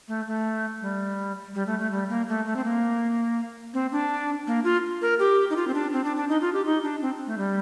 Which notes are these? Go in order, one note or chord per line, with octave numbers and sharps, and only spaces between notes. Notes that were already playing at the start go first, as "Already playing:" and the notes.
A3
A3
G3
G3
A3
A3
G3
A#3
A3
A3
C4
A#3
C4
D4
A#3
F4
A#4
G4
D#4
F4
C4
D4
C4
D4
D4
D#4
F4
G4
D#4
D4
C4
A3
G3